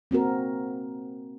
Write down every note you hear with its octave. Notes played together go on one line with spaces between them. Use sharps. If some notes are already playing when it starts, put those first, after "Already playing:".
A#3 C4 F#4 A#4